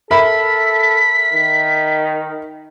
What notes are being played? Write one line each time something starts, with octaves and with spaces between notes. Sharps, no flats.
A4 A#4 E5 B5 B6
D#3